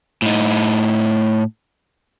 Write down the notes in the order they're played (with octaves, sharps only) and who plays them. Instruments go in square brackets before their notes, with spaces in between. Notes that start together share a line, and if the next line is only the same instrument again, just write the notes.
[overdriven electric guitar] A2 D#4